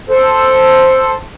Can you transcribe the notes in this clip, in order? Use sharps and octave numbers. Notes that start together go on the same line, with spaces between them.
A4 C5